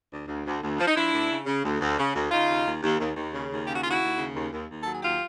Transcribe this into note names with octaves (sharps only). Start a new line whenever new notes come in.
D2
D2
D2
D2
F3
D#4
F3 D4 E4
D2
C#3
C#3
D2
D2
C#3
D2
C#3 D#4 F4
D#2
D#2
D#2
D#2
D#2
C#3
D#2
C#3 G4
F#4
D#2 F4
E4 F#4
D#2
C#3
D#2
D#2
D#2
F#3 A4
G#4
D#2 F4 G4